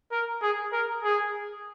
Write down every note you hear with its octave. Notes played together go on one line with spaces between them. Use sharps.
A#4
G#4
A#4
G#4